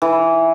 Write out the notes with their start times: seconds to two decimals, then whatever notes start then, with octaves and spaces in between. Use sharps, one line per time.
0.02 E3